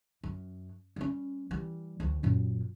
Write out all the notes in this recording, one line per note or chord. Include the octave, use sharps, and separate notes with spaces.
F#2
G3 C#4
E3 G3
D2 F#3
F#2 A#2